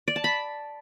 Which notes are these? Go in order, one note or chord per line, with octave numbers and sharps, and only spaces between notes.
D5
A5
B5